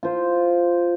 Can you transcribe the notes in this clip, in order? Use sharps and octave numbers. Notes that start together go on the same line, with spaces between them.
F4 C5